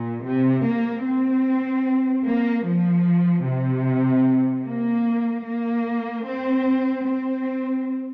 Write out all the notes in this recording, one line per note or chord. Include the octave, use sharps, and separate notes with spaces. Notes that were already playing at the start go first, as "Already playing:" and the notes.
Already playing: A#2
C3
A#3
C4
A#3
F3
C3
A#3
A#3
C4
C4